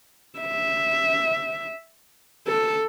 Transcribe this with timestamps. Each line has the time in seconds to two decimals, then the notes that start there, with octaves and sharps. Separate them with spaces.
0.39 E5
2.48 A4